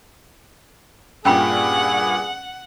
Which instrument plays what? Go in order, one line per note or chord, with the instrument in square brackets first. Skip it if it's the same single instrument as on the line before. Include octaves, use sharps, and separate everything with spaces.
[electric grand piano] G2 A#2 [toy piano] C#4 G5 B5 [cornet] G#4 [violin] F#5